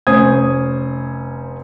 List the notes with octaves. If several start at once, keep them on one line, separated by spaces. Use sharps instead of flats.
F1 C#4 C5 G#5 D#6 G#6